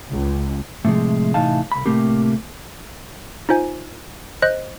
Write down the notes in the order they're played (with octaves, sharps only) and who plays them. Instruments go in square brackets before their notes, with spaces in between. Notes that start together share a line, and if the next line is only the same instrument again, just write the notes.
[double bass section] C#2
[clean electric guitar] A2 C3 F3 G#3
A2 C3 E3 D#4 F5 A5
C2 B5
A2 C3 A3 A#3 C4 G4
[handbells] D#4 F4 C5 G#5
C5 D#5 F#6